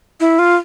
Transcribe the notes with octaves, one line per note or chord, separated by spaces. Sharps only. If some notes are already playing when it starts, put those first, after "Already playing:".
E4
F4